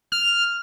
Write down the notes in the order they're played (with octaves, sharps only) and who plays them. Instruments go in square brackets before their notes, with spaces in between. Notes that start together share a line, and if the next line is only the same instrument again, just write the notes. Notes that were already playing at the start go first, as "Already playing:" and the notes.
[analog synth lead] F6